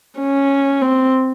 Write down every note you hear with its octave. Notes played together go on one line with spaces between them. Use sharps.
C#4
C4